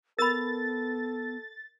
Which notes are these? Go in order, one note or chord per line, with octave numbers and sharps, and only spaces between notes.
B3 A4 A#4 B5 A6